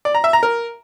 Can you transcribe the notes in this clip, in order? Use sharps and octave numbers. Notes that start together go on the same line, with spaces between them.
D5
A#5
E5
A#5
A#4